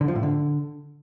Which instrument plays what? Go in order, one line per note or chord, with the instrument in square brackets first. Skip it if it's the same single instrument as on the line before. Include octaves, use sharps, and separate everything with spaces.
[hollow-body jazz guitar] D3
F3
A2
D3